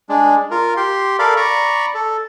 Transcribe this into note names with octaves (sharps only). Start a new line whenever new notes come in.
G#3 D4
F4 A#4
G4 C6
A4 A#4 D5 F5 B5
D5 A#5 B5 C#6
A4